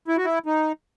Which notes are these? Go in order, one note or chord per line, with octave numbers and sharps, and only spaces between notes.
E4
F#4
E4
D#4